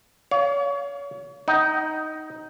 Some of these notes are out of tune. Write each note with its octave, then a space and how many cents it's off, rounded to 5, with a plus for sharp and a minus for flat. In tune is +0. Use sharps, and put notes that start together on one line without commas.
C#5 +35 F5 +0
D#4 +5 F#5 +40